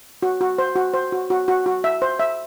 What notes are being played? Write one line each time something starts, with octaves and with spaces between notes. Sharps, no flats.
F#4
F#4
C5
F#4
C5
F#4
F#4
F#4
F#4
E5
C5
E5